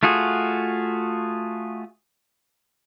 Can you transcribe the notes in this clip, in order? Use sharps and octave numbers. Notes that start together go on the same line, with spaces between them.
A3 F4 F#4 G#4